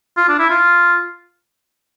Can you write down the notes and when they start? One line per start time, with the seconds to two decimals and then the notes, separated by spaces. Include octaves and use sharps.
0.17 F4
0.29 D4
0.39 E4
0.50 F4